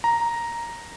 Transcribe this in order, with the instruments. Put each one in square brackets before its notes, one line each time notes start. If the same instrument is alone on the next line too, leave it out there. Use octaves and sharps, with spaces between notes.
[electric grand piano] A#5